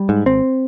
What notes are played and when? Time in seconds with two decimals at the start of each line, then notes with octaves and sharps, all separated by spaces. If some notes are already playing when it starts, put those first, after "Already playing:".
Already playing: G3
0.09 G#2
0.26 G#1 C4